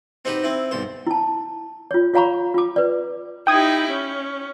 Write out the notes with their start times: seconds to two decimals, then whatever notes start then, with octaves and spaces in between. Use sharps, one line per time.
0.25 C4 D#4 F#4 G4 B4
0.44 C4 E4
0.71 B1 G2 C5
1.07 E4 A5
1.91 F4 C#5
2.14 F4 C#5 F5 A#5 B5 C#6
2.54 F4 D6
2.76 B4 D5
3.47 D#4 E4 G4 G5 D#6 G#6
3.89 C#4